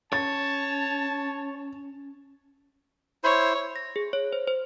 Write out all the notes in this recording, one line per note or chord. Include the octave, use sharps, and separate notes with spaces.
C#4 C#5 A5 A6
E4 C5 C#5
A#6
G#4
C#5
C5
C5